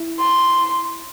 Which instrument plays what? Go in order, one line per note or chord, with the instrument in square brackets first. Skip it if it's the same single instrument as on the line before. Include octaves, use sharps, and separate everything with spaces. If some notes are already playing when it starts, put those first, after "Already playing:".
Already playing: [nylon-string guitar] E4
[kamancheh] C6